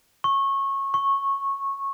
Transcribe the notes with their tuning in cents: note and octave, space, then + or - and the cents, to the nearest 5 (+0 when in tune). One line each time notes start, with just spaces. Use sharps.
C#6 -20
C#6 -10